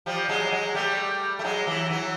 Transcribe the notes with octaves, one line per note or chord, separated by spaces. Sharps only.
F3 G3
F#3 G#3
F#3 G#3
G3 A3
A3
F#3 G#3
E3 F#3
E3 F#3